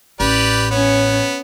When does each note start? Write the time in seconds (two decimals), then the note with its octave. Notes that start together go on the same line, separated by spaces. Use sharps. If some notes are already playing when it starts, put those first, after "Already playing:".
0.20 A1 G4 B4 D5
0.71 B3 C#4 C#5